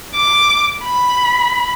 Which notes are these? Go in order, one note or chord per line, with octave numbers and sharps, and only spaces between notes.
D6
B5